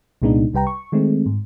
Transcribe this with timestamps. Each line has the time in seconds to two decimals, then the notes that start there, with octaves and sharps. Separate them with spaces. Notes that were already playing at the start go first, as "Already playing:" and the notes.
0.22 C2 A#2 G#3 B3 D4 D#4
0.53 C2 G3 B4 G5 A#5
0.67 C#6
0.92 D#3 G#3 A3 C4
1.26 G#2